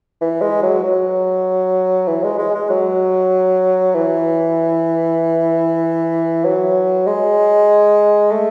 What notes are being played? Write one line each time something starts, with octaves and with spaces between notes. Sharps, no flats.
E3
G#3
F#3
F#3
E3
G#3
G#3
G#3
F#3
E3
F#3
G#3
A3